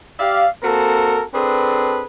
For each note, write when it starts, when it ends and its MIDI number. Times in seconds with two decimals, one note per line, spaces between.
0.19 0.46 67
0.19 0.46 74
0.19 0.46 76
0.19 0.46 77
0.63 1.22 58
0.63 1.22 60
0.63 1.22 66
0.63 1.22 69
0.63 1.22 70
1.33 2.04 60
1.33 2.04 62
1.33 2.04 68
1.33 2.04 69
1.33 2.04 71